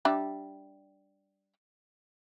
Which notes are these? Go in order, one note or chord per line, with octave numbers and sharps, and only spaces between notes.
G3 D4 E5